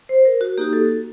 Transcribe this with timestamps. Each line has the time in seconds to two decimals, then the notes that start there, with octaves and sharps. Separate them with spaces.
0.09 C5
0.25 A#4
0.41 F#4
0.58 A#3 D#4 F#4 G4
0.73 A4